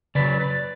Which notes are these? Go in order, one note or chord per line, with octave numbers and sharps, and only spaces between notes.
C#3 F#3 B4 D5
B4 D5